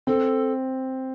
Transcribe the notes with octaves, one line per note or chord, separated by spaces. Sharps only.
C4 A4